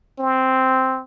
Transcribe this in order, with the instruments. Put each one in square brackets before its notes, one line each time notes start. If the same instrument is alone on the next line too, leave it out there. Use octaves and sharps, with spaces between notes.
[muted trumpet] C4